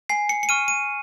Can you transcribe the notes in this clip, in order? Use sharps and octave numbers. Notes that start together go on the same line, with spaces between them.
G#5 C7
C#7
C#7
C#6 F6 D#7
D#7